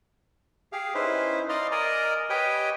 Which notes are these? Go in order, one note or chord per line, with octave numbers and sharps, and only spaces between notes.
G4 G#4 F5
C#4 D#4 E4 B4 C5
D5 D#5 F5 A#5 C6
A#4 D5 D#5 G#5 A#5
G4 B4 C#5 D#5 G5 G#5